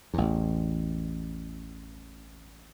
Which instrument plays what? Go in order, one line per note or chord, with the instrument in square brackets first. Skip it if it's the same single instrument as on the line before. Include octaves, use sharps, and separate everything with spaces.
[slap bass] A1 E2